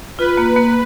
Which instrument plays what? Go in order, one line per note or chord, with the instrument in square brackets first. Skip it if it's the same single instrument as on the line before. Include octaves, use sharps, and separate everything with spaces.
[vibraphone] F4 [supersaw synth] B4
[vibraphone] A#3
A#3